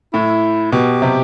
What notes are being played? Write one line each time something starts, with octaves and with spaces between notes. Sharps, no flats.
A2 E4
B2 G4
C3